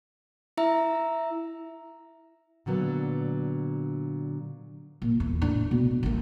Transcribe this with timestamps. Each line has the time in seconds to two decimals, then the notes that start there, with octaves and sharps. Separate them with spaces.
0.57 E4 E5 A#5
2.66 A#2 D3 F#3 B3
5.02 A#2
5.20 E2
5.42 A2 D4
5.71 B2
6.03 A1 A#3